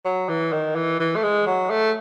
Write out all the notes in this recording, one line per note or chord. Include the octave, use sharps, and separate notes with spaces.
F#3
E3
D#3
E3
E3
A3
G#3
F#3
A3